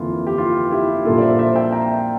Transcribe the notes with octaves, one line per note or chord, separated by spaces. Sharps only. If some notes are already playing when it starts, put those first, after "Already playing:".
Already playing: G1 F2 E3 A#3 F4
G4
F4
E4 G4
A#1 A#2 G3 A#3 F4 A4
D5
C5 E5
C5 E5
E5 G5
G5 A#5